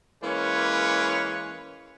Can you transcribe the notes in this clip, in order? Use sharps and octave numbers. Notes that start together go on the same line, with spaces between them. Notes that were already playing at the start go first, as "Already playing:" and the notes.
E3 G#3 A#3 C#4 B4 C#5